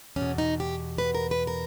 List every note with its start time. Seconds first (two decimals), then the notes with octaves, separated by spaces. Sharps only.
0.16 E2 B2 C#4
0.38 D#4
0.60 G4
0.98 B4
1.15 A#4
1.31 B4
1.47 A#4